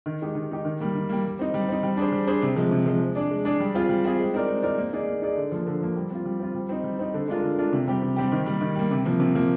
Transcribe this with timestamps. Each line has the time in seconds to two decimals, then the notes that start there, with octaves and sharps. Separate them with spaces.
0.06 D#3
0.21 G#3 D#4 G4
0.35 D#3
0.50 G#3 D#4 G4
0.65 D#3
0.80 G3 A#3
0.95 D#3
1.09 G3 A#3
1.24 G3
1.39 C4 D#4
1.54 G3
1.68 C4 D#4
1.83 G3
1.97 D4 G#4 C5
2.12 G3
2.27 D4 G#4 C5
2.42 C3
2.56 F3 G#3
2.71 C3
2.86 F3 G#3
3.01 G#3
3.15 D4 G#4 D5
3.31 G#3
3.45 D4 G#4 D5
3.60 G3
3.74 C4 F4 G#4
3.89 G3
4.04 C4 F4 G#4
4.19 G#3
4.34 C4 D#4 A#4 D5
4.48 G#3
4.63 C4 D#4 A#4 D5
4.78 A#3
4.93 D#4 G#4 D5
5.07 A#3
5.22 D#4 G#4 D5
5.37 D3
5.52 F3 A#3
5.66 D3
5.81 F3 A#3
5.96 G3
6.10 C4 F4
6.25 G3
6.39 C4 F4
6.55 G3
6.69 C4 D#4
6.84 G3
6.99 C4 D#4
7.14 D3
7.28 G#3 D4 F4 A#4
7.44 D3
7.58 G#3 D4 F4 A#4
7.73 C3
7.87 G3 C4 G4
8.03 C3
8.17 G3 C4 G4
8.32 D#3
8.46 G3 A#3
8.61 D#3
8.75 G3 A#3
8.91 C3
9.05 F3 A#3
9.20 C3
9.35 F3 A#3